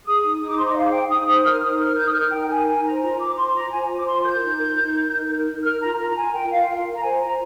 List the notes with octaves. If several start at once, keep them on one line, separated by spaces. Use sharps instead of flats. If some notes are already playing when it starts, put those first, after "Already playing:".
G#4 D#6
D#4
D#4 D#6
D6
C5 C6
D6
D#5
G#4 F5
D#4 G5
D#4 D#6
C5 D#6
A#4 F6
D#4 D#6
A#4 F6
D#4 G6
D#6
A#4 F6
D#4 G5
A#4 G#5
D#4 G#5
C5 A#5
F4 A#5
C5 D6
F4 C6
C5 A#5
F4 G#5
C5
D6
F4 C6
A#4 G6
D#4
A#4
D#4
A#4
D#4
A#4
D#4
A#4 F6
F4 A#5
A#4 A#5
A#5
F4 G#5
A#4 G5
F4 F5
A#4 F5
F4
A#5
C5 G#5
F4 A#5